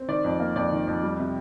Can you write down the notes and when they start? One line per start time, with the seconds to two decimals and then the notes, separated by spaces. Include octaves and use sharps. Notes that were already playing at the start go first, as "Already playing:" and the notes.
Already playing: C4
0.08 D#3 D5
0.24 F2
0.40 A#3
0.56 F2 D5
0.72 D#3
0.87 F2
1.03 G3
1.19 C3